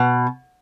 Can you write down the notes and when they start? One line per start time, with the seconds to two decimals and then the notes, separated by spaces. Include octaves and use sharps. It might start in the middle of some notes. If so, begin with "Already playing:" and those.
Already playing: B2